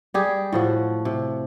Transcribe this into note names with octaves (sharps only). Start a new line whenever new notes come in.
G3 G4 G#4
A2 F3 F#4
C3